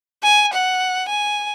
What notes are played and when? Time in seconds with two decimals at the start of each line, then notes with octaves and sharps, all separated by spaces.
0.23 G#5
0.53 F#5
1.09 G#5